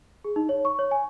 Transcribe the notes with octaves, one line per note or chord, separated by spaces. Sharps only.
G#4
D#4
C#5
C#6
C#5
G#5